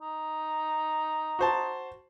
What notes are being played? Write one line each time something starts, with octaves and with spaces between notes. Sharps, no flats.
D#4
F#4 C5 A5